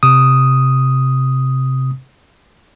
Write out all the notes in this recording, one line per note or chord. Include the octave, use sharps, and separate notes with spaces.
C3 D#6